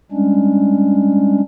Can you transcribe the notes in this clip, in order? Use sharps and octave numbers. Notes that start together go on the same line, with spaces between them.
G3 G#3 C#4 D4